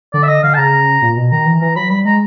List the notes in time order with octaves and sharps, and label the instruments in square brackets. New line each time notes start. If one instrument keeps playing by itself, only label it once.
[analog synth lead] D3 [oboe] D5
[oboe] E5
D#5
[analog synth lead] D3 [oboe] F5
[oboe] A5
[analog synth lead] C#3 [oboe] A#5
[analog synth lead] A#2
B2
[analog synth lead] D#3 [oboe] A#5
[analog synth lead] E3
[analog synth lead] E3 [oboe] A#5
[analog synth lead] F#3 [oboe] B5
[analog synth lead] G3 [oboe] B5
[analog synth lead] G#3 [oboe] A#5